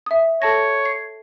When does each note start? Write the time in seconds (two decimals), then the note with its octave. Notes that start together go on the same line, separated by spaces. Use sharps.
0.06 E5 D#6
0.42 A4 C#5 A5 A#6
0.85 C7